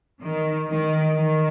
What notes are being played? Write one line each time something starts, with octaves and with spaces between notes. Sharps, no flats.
D#3
D#3
D#3